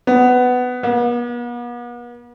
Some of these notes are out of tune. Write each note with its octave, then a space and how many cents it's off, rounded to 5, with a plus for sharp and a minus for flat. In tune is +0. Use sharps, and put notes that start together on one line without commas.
B3 +15
B3 -40